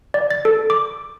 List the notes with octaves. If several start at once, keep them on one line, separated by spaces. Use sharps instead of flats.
D5
A6
A4
D6